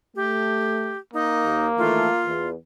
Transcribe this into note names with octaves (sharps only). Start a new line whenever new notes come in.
A3 G4
A#3 D#4
D#2
D#3 E3 A3 F4
E2